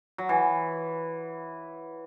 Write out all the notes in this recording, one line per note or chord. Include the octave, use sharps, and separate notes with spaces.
F#3
E3